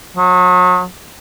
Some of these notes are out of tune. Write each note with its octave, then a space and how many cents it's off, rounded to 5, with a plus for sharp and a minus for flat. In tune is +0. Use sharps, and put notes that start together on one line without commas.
F#3 -35